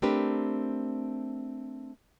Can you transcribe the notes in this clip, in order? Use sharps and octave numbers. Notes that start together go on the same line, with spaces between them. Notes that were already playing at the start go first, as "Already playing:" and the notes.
A3 C4 D4 G4 A#4 B4